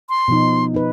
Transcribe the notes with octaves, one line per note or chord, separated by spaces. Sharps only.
C6
B2 F3 D#4
D#4 B4